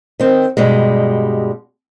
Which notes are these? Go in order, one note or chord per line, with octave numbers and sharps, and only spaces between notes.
D#3 C4
G2 B2 G3 G#3